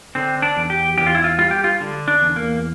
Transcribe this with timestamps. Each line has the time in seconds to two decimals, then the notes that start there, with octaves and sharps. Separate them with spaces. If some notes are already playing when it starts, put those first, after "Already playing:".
0.15 D3 C4
0.42 D4
0.56 E2
0.70 G4
0.98 E2 G4
1.07 F4
1.15 E4
1.24 F4
1.39 G3 F4
1.51 G4
1.64 F4
1.80 D3
2.08 D4
2.22 E2
2.36 A#3